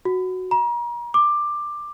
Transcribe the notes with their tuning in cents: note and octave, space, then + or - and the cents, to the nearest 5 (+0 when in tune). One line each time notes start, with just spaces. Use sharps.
F#4 +0
A#5 +35
D6 +15